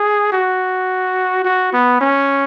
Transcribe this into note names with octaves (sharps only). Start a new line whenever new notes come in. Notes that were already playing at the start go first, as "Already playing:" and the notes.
Already playing: G#4
F#4
F#4
B3
C#4